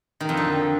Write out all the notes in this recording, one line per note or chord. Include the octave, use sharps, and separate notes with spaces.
D#3
F2
D3